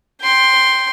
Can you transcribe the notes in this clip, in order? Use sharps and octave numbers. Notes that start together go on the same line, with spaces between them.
G5 C6